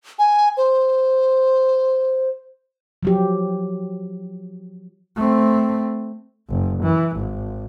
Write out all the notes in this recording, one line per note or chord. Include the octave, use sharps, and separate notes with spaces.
G#5
C5
F3 F#3 G4
A3 C4
F#1
E3
G#1